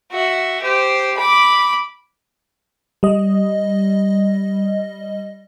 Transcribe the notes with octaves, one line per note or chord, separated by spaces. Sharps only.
F#4 E5
G4 C5
B5 D6
G3 D#5